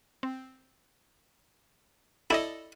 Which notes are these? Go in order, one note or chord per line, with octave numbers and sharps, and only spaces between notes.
C4
E4 A4 D5 D#5